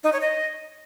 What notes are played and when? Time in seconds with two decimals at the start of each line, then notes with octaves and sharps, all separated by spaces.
0.04 D#4
0.12 C#5
0.21 D#5